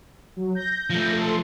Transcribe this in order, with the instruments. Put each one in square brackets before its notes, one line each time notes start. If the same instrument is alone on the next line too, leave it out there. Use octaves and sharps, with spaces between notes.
[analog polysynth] F#3
G6 A#6
[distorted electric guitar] F3 A3
[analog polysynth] A4 C6